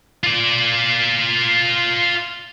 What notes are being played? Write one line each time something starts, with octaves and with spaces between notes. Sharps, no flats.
F4 D5